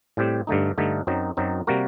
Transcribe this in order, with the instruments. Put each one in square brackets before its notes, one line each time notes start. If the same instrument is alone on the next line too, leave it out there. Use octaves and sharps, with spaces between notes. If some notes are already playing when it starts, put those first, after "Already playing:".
[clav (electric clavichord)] A2 G3 C4 G4
G2 D3 A3 D#4
G2 D3 A3 D#4
F#2 F#3 C4 D#4
F#2 F#3 C4 D#4
C3 G3 A#3 F#4 A#4